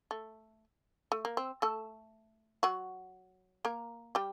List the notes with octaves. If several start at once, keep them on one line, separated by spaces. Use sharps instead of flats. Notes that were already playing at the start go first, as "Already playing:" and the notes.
A3
A3
A#3
C4
A3 A4
F#3 F#4
A#3 A#4
G3 G4